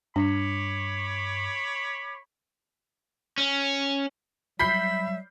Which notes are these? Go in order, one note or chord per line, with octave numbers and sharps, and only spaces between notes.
G2 D4 C#5 B5 D6
C#4
F#3 G3 E5 B5 G6 B6 C7